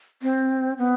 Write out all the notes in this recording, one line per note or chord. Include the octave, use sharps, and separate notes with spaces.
C4
B3